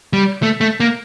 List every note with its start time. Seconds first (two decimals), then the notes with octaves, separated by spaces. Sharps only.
0.13 G3
0.43 A3
0.61 A3
0.80 A#3